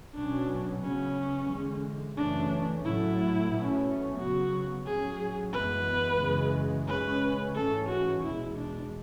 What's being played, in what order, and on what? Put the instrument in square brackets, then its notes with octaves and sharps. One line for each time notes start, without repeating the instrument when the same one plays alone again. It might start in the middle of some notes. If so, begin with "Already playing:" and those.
[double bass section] B2 F#3 C#4 [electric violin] D4
[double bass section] C#3 F#3 B3 [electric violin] C#4
[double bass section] E2 D3 G#3
[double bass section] F#2 C#3 E3 A3 C#4 [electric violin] D4
[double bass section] A2 F#3 A3 [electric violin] E4
[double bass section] B2 A3 C#4
[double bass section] C#3 F#3 B3 [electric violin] F#4
[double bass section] A2 F#3 C#4 [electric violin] G#4
[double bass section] F#2 E3 G#3 B3 [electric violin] B4
[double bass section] F#2 C#3 E3 G#3
[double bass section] C#3 G#3 C#4 [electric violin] B4
[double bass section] G#2 E3 A3 C#4 [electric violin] A4
[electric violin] F#4
[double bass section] E2 B2 G#3 [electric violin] E4
[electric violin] D4